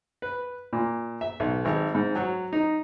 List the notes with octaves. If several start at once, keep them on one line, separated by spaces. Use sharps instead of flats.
B4
A#2
E5
B1
G#1
G#2
F#3
D#4